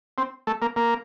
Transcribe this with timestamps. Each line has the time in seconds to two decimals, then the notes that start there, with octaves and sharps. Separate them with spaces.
0.18 C4
0.47 A3
0.62 A#3
0.76 A#3